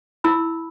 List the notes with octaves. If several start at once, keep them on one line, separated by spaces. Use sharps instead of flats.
E4 B5 E6